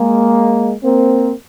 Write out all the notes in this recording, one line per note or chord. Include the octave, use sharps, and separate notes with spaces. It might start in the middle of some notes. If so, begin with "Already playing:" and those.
Already playing: G#3 A#3
A#3 C4